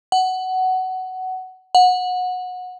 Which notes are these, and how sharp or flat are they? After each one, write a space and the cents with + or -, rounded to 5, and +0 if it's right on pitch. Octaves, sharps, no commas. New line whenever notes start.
F#5 +15
F#5 -20